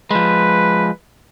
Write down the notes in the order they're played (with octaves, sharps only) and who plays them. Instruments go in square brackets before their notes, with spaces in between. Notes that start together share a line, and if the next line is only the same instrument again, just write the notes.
[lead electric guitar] F3 G#3 [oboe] B4